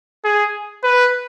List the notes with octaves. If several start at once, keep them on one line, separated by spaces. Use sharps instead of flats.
G#4
B4